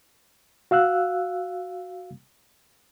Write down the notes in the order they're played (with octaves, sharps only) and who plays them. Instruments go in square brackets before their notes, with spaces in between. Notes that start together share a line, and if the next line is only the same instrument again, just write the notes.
[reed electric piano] F#4 F5 E6 F#6